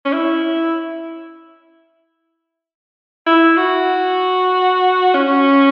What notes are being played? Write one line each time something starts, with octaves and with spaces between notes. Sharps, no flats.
C#4
E4
E4
F#4
C#4